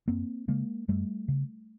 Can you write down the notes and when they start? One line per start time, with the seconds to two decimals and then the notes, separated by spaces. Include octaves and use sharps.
0.08 F#2 A#3 C4
0.48 C#3 G#3 A#3
0.88 F#2 G3 A3
1.28 C#3